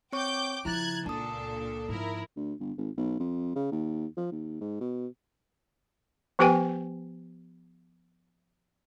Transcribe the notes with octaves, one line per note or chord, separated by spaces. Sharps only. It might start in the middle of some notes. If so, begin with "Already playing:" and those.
C4 C#5 G5 C#6 D6 G6
C#3 F3 E4 A#5 F#6 G#6 A6
C#2 A#2 D4 A4 A5 D#6
G#2 F3 E4 A#4
D2
G1
G#1
B1
F2
C#3
D#2
F3
D#2
G#2
B2
F3 B3 G4 B4 G5 G#5